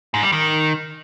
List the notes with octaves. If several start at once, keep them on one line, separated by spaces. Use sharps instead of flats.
G#2
G3
D#3